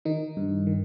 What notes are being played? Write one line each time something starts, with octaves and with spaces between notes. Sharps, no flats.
D#3 D#4
G2
D#3